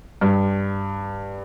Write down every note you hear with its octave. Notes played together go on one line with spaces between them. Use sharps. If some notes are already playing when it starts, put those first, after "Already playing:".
G2